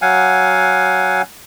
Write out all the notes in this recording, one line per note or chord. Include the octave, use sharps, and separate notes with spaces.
F#3 F5 F#5 G#5